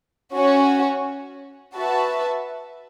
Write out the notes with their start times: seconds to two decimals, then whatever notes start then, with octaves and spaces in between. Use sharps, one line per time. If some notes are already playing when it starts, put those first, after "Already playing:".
0.34 C#4 F#4 C#5
1.76 F#4 B4 E5 A5